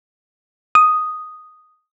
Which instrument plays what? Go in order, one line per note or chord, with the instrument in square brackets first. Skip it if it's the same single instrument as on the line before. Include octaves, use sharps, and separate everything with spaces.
[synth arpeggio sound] D#6